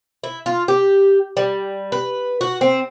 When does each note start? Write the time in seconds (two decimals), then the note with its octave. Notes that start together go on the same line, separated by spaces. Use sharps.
0.24 E4
0.46 F4
0.68 G4
1.37 G3
1.92 B4
2.41 F#4
2.61 C4